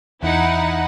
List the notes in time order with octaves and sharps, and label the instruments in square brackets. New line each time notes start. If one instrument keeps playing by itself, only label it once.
[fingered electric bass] E2 [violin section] D#4 E4 F#5